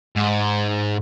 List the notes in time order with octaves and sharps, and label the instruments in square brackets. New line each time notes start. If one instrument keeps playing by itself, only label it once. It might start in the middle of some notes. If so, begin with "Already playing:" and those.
[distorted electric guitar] G#2